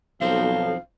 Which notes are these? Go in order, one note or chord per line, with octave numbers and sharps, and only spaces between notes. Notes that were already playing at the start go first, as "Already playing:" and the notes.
B1 F3 C4 A4 C5 F5